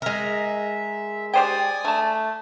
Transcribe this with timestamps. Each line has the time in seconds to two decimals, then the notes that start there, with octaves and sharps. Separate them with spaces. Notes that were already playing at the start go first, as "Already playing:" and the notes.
0.02 G#3 A#4 E5
1.34 G4 C5 D5 G5 G#5 D#6
1.85 A3 A5